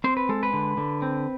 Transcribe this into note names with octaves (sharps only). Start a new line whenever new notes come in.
C4 C5
B4
G#3 A4
B4
D3
D3
C4